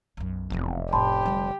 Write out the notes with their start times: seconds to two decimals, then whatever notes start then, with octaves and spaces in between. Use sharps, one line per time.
0.17 B1 F#2
0.50 F1 E2 C4
0.93 A2 C#4 G4 A5 B5 C6
1.26 D3 G3